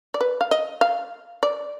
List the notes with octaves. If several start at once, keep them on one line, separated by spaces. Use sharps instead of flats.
D5
B4
F5
D#5
F5
D5